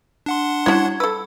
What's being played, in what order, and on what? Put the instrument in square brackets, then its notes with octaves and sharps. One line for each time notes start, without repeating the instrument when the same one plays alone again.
[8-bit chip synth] D4 F#5 C6
[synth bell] G3 E4 G#6 [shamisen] C#4 F#4
[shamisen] A4 B4 [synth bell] E6